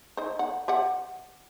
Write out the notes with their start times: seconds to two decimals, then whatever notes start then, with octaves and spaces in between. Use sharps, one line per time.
0.17 D#4 C5
0.39 F#5
0.68 G4 E5 F#5